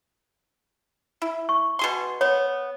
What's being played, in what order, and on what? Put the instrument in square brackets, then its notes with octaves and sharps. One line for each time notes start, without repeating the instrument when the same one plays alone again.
[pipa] E4
[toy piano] C#6
[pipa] B2 G#4 C6
[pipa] B3 [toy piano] C#5